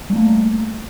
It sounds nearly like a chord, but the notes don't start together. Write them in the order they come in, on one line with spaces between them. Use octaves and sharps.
G3 A3 A#3